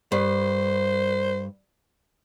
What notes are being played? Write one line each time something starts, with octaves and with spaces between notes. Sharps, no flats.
G2 C5